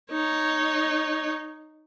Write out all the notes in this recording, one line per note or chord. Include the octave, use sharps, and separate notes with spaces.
D#4 C#5